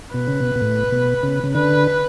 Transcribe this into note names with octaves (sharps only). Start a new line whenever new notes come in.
B2 B4
C#3
B2
B2
A2
B2
C#3
C#3
D3 B4